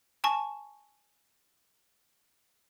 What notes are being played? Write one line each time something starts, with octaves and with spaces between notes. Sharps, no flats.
G#5 A5 C#6